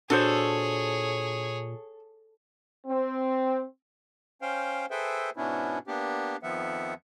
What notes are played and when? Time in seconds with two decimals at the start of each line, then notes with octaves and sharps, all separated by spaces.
0.10 A#2 D4 F#4 G#4 A4 C5 C#5
2.86 C4
4.42 C#4 C5 F5 G5
4.91 G#4 A4 B4 C5 E5 G5
5.37 G#2 B2 B3 C#4 D4 E4
5.87 A#3 B3 D4 G4
6.43 F2 D#3 F3 B3 E5 F#5